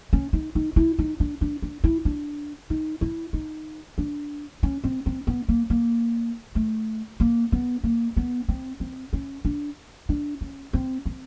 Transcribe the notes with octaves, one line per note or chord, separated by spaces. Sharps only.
C#4
D#4
D#4
E4
D#4
D4
D4
D4
E4
D4
D#4
E4
D#4
D4
C#4
C4
C4
B3
A#3
A#3
A3
A#3
B3
A#3
B3
C4
C4
C#4
D4
D4
C#4
C4
C4